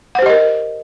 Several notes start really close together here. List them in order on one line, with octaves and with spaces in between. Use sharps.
F#5 C5 G4 D#5 A#4